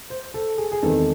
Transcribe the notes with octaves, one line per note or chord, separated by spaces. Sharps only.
C5
A4
G#4
G#4
E2 C3 D#3 G#3 C4 A4